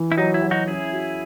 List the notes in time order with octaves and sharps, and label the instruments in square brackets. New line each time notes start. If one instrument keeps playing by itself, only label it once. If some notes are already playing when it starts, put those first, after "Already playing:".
Already playing: [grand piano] E3
[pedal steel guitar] E4
[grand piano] F#3 [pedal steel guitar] D#4
[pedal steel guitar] E4
[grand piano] F#3
[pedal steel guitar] D#4 F#4
[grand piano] C#4 [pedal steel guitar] E4 G#4
[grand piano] F#4